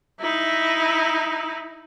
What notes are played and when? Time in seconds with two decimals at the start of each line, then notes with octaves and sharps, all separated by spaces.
0.21 D#4 E4